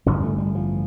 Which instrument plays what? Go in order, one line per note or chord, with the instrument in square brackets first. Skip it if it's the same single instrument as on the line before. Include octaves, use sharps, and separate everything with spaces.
[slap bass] A1 G2 D3 C#4
A3
G3
F3